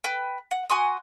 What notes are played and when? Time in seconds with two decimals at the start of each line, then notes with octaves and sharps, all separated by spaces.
0.04 B4 G5
0.51 F#5
0.70 F#4 G#5 C6 D#6